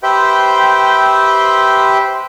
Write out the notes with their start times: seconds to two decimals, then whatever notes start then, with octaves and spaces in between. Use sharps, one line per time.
0.03 G4 B4 C5 E5 G5